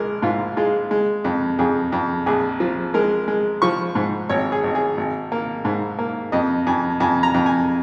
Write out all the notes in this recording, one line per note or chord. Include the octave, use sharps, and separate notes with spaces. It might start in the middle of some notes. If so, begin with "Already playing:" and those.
Already playing: A#1 G#3 A#4
G#2 F4
G#3 F4
G#3
F2
F2 G#4
F2
A#1 G#4
F3
G#3 A#4
G#3
F3 C#6
G#2
G#1 C#5
G#4
G#1
G#4
G#1
A#3
G#2
A#3
F2 D#5
F2 G#5
F2 G#5
A#5
F2
G#5